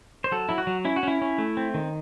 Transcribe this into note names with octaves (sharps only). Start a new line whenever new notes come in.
C5
F#3 A4
F#3 E4
F#4
F#3
C#4 E4
F#4
C#4 E4
C#4
A3
C4
D#3